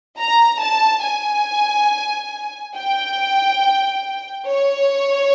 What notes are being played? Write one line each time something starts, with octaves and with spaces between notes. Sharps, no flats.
A#5
A5
G#5
G5
C#5